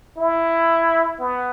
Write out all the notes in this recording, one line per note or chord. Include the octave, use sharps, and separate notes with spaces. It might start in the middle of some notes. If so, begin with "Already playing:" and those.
E4
B3